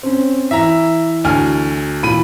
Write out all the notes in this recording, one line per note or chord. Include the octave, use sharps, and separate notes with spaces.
C4 C#4
E3 E5 A#5
D2 G#5 F6
A#2 E3 B5 D#7